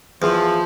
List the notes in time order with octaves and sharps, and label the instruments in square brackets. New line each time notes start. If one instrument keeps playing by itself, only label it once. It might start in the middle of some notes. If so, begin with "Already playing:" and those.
[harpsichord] E2 [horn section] F3